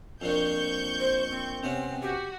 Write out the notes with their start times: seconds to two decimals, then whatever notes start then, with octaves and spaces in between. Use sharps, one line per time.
0.22 F2 A#3 D4 C#6 G6
1.00 C5
1.30 C4
1.63 C3 B3 C#4
2.02 F#4 G4